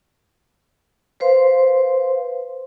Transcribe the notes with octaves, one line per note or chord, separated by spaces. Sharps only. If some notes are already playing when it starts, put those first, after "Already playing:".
B4 C5 F5 C6